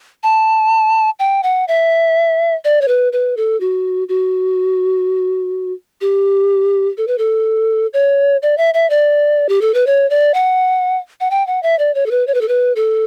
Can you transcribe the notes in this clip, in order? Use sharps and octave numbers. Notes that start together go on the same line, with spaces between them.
A5
G5
F#5
E5
D5
C#5
B4
B4
A4
F#4
F#4
G4
A4
B4
A4
C#5
D5
E5
E5
D5
G4
A4
B4
C#5
D5
F#5
F#5
G5
F#5
E5
D5
C#5
A4
B4
C#5
B4
A4
B4
A4